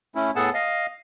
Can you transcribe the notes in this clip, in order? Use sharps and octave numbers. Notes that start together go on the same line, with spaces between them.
A3 C#4 E4
A2 B3 G#4 A4 F#5 A5
D#5 F5